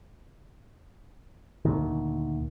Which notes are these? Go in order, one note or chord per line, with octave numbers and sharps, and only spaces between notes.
D2 A#2 D#3